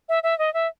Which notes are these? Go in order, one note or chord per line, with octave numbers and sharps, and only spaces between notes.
E5
E5
D#5
E5